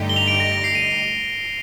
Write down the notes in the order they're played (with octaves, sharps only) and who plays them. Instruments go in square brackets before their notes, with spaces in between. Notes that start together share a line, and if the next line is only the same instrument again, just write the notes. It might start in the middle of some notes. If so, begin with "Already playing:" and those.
Already playing: [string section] G2 D3 A3 D#4 G4
[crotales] G7
F7
D7
A#6
A#6
C7
D#7